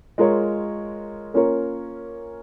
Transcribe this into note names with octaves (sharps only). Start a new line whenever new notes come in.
G#3 F4 A#4 C#5
A#3 C#4 F4 A#4 C#5